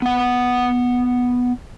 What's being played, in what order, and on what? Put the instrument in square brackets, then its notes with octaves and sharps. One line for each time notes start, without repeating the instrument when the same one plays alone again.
[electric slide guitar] B3 F#5